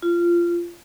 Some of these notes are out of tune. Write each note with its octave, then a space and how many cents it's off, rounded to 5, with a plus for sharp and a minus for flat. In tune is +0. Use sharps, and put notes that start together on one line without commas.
F4 -20